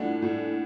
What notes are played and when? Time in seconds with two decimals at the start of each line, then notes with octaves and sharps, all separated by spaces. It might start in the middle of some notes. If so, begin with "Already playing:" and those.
Already playing: A2 E3 A3 D4 F#5
0.22 A2